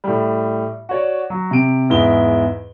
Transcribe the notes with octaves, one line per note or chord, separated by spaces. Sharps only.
A2 G3
F#4 C#5 D5
F#3
C3 D7
E2 G#2 E4 G7